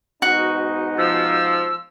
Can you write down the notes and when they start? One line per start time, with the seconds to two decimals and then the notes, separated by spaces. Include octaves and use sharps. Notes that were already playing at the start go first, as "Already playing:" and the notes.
0.22 G#2 B2 D#4 F#4
0.98 F3 E6